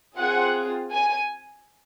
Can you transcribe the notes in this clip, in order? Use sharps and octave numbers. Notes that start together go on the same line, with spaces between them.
C4 F4 G#4 F#5
G#5